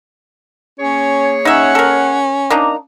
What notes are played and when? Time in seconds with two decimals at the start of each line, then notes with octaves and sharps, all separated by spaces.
0.80 A#3 C#4 G#4 C#5
1.45 C#4 D#4 E5 F#5
1.75 A4 A#4
2.50 A#3 D4 D#4 A#5